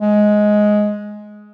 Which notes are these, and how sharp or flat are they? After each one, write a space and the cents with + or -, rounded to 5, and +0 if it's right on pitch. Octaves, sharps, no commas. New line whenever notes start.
G#3 +10